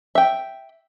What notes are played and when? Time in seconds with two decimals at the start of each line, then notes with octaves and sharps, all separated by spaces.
0.15 E5 G5